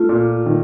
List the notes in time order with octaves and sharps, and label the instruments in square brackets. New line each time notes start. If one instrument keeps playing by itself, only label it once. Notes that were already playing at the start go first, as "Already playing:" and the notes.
Already playing: [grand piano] A3 [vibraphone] F4
[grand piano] A#2
D#3